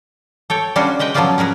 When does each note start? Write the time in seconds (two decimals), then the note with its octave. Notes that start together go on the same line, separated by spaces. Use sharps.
0.50 A4 C#5 G5
0.76 G3 C#4 D4 F4 F#4
0.99 G#3 B4 D#5 G5
1.14 F3 F#3 B3 C#4 F4 D5
1.38 C#4 G#4 A#4 B4